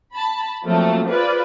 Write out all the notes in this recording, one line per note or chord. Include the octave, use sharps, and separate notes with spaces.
A5 B5
F3 F#3 A3 A#3 C4
F4 G#4 B4 C5 D5